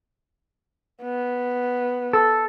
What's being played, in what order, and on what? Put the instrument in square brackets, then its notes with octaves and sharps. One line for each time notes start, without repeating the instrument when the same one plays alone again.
[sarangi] B3
[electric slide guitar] A4